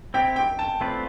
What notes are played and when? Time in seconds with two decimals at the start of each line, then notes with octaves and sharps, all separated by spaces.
0.14 C4 E4 G4 G5
0.36 G5
0.59 A5
0.81 A3 C4 F4 B4 D5